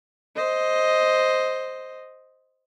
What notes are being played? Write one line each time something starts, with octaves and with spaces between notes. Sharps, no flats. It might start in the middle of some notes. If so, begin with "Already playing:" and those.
C5 D#5